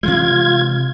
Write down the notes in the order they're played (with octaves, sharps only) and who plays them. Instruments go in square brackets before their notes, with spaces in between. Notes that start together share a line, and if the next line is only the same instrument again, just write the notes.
[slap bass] C3 E3 G#3 [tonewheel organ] F4 G#6